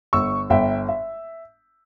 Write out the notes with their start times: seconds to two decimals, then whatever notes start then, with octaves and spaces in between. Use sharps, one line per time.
0.13 G1 C#6 E6
0.50 G1 E5 G5
0.89 E5